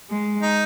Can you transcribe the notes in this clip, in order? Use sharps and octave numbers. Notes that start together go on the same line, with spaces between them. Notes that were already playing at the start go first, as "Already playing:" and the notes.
G#3
D#4